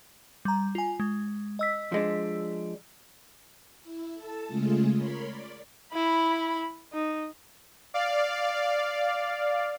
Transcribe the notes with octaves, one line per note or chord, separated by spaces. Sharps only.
G3 A#5
F4 G#5
G#3
D#5 E6 B6
F3 G#3 D4
E4
A4 A5
C#3 G#3 A3 F4 G#4
A#4 C#5 B5 C6
D5
E4 B5
D#4
D5 F5